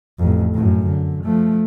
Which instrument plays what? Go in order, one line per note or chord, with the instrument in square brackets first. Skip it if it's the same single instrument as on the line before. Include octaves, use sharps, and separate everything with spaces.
[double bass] A1 F2
F#2 A2
D3
F3 A3